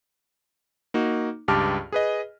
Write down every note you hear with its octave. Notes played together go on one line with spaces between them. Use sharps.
A#3 D#4 F#4
C#2 G2 G4 A5 D6 F6
G#4 B4 D#5